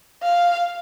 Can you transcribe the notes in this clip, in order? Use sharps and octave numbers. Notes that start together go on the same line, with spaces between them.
F5